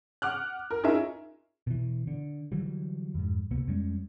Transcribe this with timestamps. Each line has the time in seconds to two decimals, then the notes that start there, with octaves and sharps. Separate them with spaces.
0.22 F#5 D6 F6 F#6
0.71 A#4
0.83 C#4 D#4 F4 G#4 A#4 E5
1.67 B2 E3
2.07 D3
2.52 D3 E3 F#3 G3
3.15 F2 G#2
3.51 C#2 C3 A#3 B3
3.67 F2 G3 G#3 C#4